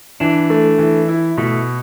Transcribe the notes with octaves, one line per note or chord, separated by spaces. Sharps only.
E3 D4
A3
E3
E4
B2 A3